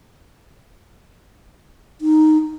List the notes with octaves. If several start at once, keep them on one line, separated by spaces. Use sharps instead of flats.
D#4